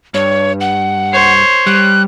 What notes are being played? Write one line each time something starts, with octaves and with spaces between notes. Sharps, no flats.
G2 C#5
F#5
C5 C#5
G3 F#6